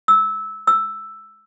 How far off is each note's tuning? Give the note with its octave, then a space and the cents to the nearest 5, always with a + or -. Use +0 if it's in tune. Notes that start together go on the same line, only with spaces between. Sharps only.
E6 -15
E6 +5